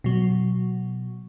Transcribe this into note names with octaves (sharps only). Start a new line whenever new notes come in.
B2 F#3